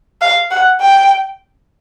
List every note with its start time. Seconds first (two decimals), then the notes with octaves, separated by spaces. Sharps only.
0.22 F5
0.51 F#5
0.81 G5